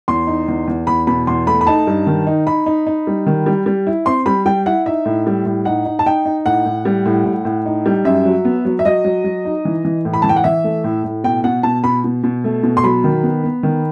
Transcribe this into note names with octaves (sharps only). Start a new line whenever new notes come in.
E2 C6
D#4
E2
E2
E2 B5
B2 B5
E2 C6
A3 B5
B5
D#4 A5
G2
D#3
D#4
D#4 B5
D#4
D#4
G3
D#3
G3
G3
E4
C4 C6
G3 B5
G3 G5
E4 F#5
D#4 E5
A2
G3
A2
D#4 F#5
D#4
A5
D#4 G5
D#4
A2 F#5
A2
G3
A2
A2
A2
D#4
G3
F#2 E5
F#3
B3
F#3
E5
F#3 D#5
F#3
F#3
D#4
E3
E3
A2
B5
E3 A5
G5
F#5
E3 E5
A3
A2
A2
B2 G5
B2 F#5
B2 A5
B2 B5
B2
B2
A3
B2
C6
F#3 B5
D#3
B3
B3
D#3